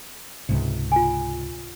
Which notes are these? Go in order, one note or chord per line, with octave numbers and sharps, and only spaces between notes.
C#2 G#2 C3
F4 G#5